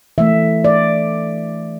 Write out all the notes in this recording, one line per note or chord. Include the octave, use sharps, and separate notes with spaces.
E3 A3 E5
D5